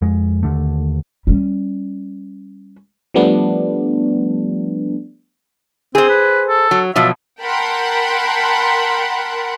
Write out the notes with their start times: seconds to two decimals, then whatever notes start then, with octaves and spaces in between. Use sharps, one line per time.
0.02 F2 G#3
0.43 D#2 D3 A3
1.27 G3 C#4
3.14 F3 G3 A3 B3 D4
5.95 C4 G#4 C5
6.09 B4
6.48 A4
6.71 F#3
6.96 B2 F3 F#3 E5
7.42 A#4 F#5 G5 A5 B5 C6